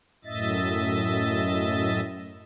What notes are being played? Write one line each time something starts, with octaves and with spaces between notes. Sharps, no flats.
F#2 A2 D#5 E5 A6